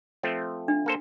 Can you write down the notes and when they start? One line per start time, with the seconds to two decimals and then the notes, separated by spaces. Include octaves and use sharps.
0.23 F3 A3 C4
0.68 D4
0.86 A#3 A4 C5